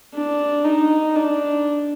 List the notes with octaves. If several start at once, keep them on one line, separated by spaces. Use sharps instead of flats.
D4
D#4
D4